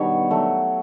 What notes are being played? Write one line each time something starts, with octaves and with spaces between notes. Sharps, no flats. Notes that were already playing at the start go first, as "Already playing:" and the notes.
Already playing: G2 B2 D#3 G3 C#5
F#3 A3